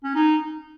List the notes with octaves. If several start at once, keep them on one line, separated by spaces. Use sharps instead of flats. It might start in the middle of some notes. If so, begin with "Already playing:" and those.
C#4
D#4